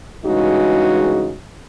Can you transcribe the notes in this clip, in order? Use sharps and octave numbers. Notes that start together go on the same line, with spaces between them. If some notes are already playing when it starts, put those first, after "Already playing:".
G2 C#3 E3 G#3 D#4 F#4